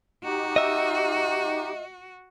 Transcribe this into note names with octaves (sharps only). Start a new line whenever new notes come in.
D#4 F#4 G4
D#5 E5